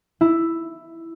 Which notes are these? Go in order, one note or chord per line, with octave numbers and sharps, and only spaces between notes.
E4